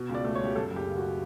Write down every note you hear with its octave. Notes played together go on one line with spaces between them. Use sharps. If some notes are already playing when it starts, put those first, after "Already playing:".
Already playing: B2
C#2
D5
A3
C#5
C#2 G4
F#2 A4
F#1
G4
C#3
F#4